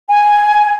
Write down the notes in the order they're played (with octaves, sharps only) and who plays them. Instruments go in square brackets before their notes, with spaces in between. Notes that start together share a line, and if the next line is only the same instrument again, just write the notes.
[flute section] G#5